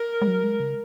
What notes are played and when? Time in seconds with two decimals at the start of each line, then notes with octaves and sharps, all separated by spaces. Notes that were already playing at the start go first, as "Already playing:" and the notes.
Already playing: A#4
0.22 G#3
0.27 F#3
0.44 G#3
0.60 C#3